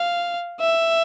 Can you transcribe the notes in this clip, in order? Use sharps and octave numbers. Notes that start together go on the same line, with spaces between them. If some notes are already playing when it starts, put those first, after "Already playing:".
Already playing: F5
E5